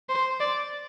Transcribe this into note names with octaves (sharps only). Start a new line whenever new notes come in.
C5
D5